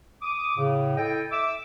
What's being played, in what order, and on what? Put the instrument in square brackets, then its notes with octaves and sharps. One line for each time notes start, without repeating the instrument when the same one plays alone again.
[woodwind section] D6 D#6
A2 C#3
E4 A4 D#5 G5
E5 D6 E6